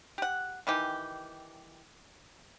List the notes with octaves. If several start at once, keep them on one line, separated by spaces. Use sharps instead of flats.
G4 F#5
D#3 E3 G4